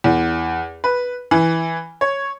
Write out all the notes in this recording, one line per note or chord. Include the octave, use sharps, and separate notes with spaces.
E2
B4
E3
C#5